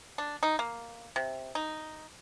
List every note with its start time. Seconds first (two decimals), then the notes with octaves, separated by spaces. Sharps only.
0.18 D4
0.43 D#4
0.59 A#3
1.16 C3
1.55 D#4